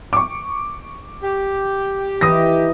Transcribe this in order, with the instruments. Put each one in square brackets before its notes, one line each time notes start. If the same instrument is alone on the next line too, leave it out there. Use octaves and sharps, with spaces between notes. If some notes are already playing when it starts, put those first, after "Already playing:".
[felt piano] C#6 D6
[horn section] G4
[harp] E3 D#4 [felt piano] D#6 A#6